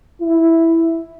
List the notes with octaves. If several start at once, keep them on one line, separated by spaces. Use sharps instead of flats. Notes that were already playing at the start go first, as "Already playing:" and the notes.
E4